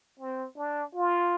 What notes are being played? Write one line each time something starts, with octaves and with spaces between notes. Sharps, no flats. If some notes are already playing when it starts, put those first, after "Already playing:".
C4
D4
F4